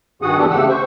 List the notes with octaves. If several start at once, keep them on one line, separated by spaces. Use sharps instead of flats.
G2 D#3 F#4 G#4 F#5 D#6
E2 E3 G3 D4 G4 A4
C#3 A3 G4 F#5 E6
C5 C#6